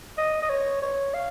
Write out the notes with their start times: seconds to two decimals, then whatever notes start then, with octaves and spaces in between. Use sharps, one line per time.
0.18 D#5
0.42 D#5
0.50 C#5
0.82 C#5
1.14 F5